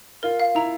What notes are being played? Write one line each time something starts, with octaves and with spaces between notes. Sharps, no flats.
F4 A#4
F5
E4 A#5